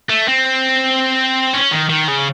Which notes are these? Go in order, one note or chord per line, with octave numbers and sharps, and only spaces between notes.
A3
C4
C#4
D#3
D#3
C#3